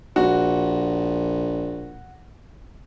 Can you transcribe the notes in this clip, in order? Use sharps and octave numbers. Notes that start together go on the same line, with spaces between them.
A#1 F#4